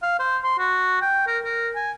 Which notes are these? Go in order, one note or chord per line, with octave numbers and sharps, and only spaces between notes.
F5
C5
C6
F#4
G5
A#4
A#4
G#5